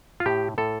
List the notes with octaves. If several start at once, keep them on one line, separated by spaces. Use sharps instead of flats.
F4
A2 G4
A2 A4